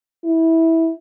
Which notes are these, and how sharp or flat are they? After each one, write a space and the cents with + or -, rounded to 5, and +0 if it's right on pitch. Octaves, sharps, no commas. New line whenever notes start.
E4 -15